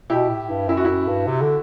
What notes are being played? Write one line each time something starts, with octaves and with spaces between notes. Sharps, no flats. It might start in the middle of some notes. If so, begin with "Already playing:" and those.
B2 E4 G4
A2
G2
F#2 E4
F#4
F#2 E4
G2
C3
D3